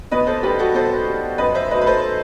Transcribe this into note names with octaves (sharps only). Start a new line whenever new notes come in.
B2 B4 D#5
A4 C5
G3 G4 B4
F#4 A4
B2 A4 C5
G3
F#2 B4 D#5
C5 E5
F#3 A3 B4 D#5
B4
A4 C5